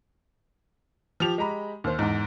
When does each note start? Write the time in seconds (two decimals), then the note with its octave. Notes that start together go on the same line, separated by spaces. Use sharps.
1.20 F3 G4 F7
1.38 G#3 G4 A#5 B5
1.84 D#2 C5
1.99 E2 G#2